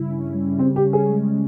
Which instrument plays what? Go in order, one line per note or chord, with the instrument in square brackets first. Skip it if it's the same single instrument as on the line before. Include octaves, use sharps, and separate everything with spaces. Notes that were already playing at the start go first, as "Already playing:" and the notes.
Already playing: [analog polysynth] G2 C#3 E4
C#4
G3
[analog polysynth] C#3 [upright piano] C4
[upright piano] G4
[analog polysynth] C#4
[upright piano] G#4
[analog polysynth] G#3